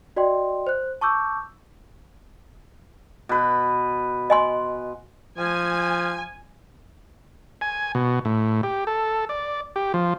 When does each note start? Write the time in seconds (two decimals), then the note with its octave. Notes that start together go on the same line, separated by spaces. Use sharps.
0.16 F#4 D5 D#5 G5 C6
0.67 C5 F#6
1.01 A5 C#6 D6 E6 G6
3.29 B2 B4
4.30 D#5 G#5 C6
5.38 F3 G#5
7.61 G#5
7.95 B2
8.25 A2
8.63 G4
8.87 A4
9.29 D5
9.76 G4
9.94 F3